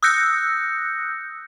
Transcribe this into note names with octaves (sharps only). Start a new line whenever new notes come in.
D#6 E6 F#6 G6 A#6 C#7